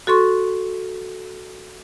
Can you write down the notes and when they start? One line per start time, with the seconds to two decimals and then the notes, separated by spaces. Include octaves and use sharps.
0.07 F#4 A4 C6 C#6